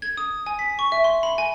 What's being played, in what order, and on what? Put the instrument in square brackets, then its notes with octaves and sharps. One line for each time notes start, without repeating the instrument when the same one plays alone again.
[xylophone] G#6
D#6
G#5
B6
C#6
E5
C6
B5
G#5